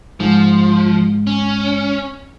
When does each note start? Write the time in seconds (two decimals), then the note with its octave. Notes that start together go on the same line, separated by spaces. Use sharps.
0.20 G#2 F3
1.27 C#4